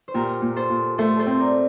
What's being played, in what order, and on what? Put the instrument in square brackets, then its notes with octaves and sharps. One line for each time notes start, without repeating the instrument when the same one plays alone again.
[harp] C5
[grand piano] A#2 [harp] G4 A#4
[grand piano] A#2
[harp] A4 C5
[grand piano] A#2
[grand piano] A3 [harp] A4 C5
[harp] A4 C5
[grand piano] C4
[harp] A#4 D5